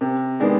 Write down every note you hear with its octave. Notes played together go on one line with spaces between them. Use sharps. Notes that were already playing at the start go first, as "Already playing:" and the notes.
C3
D#3 G#3 B3 D4